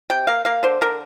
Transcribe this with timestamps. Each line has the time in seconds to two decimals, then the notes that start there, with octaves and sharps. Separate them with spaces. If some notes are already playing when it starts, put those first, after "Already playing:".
0.10 C3 G5
0.27 A#3 F5
0.45 A#3 F5
0.63 D3 C5
0.81 D3 A#4